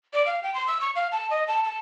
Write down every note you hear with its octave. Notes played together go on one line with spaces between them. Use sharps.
D5
F5
G5
C6
E6
C#6
F5
A5
D#5
A5
A5